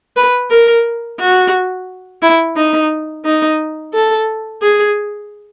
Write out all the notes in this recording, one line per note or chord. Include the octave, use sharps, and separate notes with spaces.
B4
A#4
F#4
E4
D#4
D#4
A4
G#4